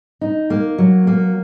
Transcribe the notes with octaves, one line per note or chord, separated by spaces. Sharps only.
D#4
A#3
F#3
A#3